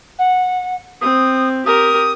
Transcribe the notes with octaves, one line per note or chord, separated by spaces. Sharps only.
F#5
C4 D#6
G4 A#4 D#6